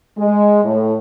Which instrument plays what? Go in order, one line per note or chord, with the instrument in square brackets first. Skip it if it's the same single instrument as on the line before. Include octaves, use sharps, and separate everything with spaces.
[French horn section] G#3
A2